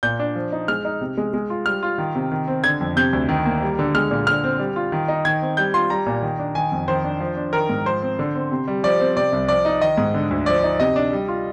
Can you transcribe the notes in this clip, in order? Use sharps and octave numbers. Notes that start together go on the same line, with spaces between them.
A#2 G6
D4
F3
D#4
G#3 F6
D#4
C3
G#3
G#3
F4
G3 F6
F4
D#3
C3
D#3
C4
D3 G#6
F2
C3 G6
D2
D#3
A#3
G3
D3
G#3 F6
A#2
D3 F6
C4
G3
F4
D#3
D#4
D#3 G#6
C4
G3 G6
F4 C6
G3 A#5
A#2
D#3
D4
D#3 G#5
F2
D#3 C5
D4
F3
D4
D#3 A#4
G#2
F3 C5
C4
D3
C4
C3
G3
F3 D5
C4
C3 D5
C2
F3 D5
D#4
D#3 D#5
G#2
D3
D2
F3 D5
D#4
C3 D#5
D4
G3
F4